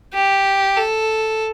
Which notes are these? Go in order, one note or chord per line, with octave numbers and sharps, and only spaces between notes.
G4
A4